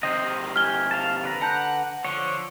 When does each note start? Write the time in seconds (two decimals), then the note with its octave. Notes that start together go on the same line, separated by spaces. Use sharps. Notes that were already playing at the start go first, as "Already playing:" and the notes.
0.03 C3 D#3 C5 D#5
0.56 G4 G#5 F6 G7
0.91 F5 A5
1.24 D3 B4 A#5
1.42 F#5 A5 G6
2.05 D3 F3 C#5